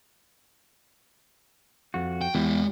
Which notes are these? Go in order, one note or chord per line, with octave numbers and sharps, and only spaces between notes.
F2 F#4
G5
E2 G#3 G4